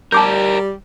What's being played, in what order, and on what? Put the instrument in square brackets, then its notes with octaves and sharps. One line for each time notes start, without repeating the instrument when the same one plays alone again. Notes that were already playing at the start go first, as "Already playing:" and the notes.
[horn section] G3 [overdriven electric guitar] G4 A#4 [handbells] A5 D6 G6